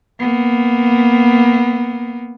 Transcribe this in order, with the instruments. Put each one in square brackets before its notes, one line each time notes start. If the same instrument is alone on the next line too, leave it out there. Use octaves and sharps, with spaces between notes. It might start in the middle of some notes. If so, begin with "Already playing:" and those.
[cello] A#3 B3